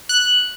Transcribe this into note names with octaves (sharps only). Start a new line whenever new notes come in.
F#6